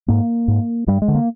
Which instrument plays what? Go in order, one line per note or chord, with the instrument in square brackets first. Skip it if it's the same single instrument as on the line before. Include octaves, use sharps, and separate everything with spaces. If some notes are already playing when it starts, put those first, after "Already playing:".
[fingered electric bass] G#2 A#3
G#2
G2 G3
G#3
D3
A#3